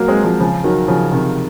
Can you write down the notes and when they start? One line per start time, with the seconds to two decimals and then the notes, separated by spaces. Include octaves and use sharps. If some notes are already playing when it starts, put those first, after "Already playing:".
Already playing: F#3 A#3
0.08 G#3 C4
0.24 F3 G#3
0.40 C#3 F3
0.64 D#3 F#3
0.88 C#3 F3
1.12 C3 D#3